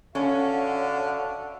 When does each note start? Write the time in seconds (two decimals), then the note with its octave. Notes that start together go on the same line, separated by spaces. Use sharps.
0.15 D3 C#4 F#4 E5 F5